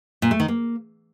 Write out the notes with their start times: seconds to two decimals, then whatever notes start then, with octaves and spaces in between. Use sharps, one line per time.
0.22 A#2
0.31 A3
0.40 D#3
0.48 A#3